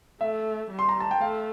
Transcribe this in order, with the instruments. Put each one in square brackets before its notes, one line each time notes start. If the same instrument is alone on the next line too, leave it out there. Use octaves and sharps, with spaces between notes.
[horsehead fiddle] A3 [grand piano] E5
[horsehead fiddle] G3
[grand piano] C6
A#5
A5
G5
[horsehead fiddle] A3 [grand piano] F5